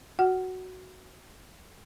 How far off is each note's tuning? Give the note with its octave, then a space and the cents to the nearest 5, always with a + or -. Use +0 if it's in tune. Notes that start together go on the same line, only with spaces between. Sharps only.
F#4 +0 F#5 +20